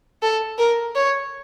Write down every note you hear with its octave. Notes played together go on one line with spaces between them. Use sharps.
A4
A#4
C#5